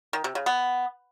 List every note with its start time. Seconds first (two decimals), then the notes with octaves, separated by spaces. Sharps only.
0.13 D#3
0.24 C3
0.35 C#3
0.46 B3